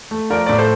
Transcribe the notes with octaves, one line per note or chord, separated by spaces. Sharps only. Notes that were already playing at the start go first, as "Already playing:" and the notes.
A3
F3 A#4 D5
A2 D5
A4 C5